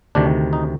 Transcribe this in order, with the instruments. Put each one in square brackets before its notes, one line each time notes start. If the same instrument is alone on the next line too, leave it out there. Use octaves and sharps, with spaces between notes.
[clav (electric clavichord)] D2 C3 D#3 D4
D#4